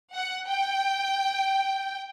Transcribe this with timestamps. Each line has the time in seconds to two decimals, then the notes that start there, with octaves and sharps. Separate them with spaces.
0.13 F#5
0.47 G5